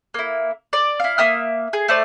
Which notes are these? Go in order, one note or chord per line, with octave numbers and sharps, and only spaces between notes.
A#3 E4
D5
E4 F5
A#3 E5 D#6 F6
G#4
A3 C5 D5